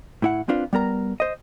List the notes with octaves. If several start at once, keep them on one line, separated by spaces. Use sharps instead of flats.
A2 E4 F#5
C4 D4 F4 B4
G3 B3 A#4 A#5
C5 D#5